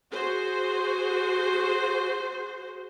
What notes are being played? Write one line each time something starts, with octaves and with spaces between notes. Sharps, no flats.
F#4 G#4 C5